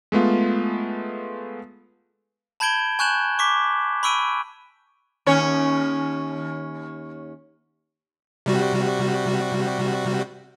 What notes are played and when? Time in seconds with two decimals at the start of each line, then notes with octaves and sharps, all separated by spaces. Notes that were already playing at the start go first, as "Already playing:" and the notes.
0.12 G#3 A3 B3 F4
2.60 A5 B5 G6 G#6 D7 G7
2.99 G#5 C#6 F#6 G6 E7 F#7
3.39 C#6 D6 B6
4.03 B5 C#6 E6 D7 D#7
5.26 D#2 C#4 C#5
8.46 C3 G3 F#4